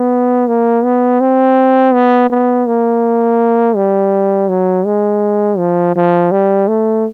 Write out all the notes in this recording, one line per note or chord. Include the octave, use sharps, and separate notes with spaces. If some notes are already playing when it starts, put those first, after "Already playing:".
Already playing: B3
A#3
B3
C4
B3
B3
A#3
G3
F#3
G#3
F3
F3
G3
A3